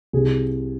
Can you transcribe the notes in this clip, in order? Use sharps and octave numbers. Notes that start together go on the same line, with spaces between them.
C2 G#4